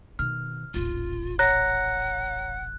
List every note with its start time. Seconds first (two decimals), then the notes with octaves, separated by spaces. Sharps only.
0.19 B2 D#3 F6
0.74 D#1 A1 F4
1.39 C#5 F#5 A#5 F#6 A#6